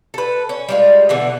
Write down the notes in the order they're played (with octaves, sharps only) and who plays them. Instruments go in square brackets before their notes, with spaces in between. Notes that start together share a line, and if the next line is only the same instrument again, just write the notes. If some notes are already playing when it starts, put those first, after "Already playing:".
[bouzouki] A4 B4
C#4
G3 G#3 F4
B2 D3 E3